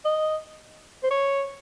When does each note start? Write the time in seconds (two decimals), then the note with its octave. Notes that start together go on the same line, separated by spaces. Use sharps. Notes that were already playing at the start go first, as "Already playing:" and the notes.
0.05 D#5
1.03 C5
1.11 C#5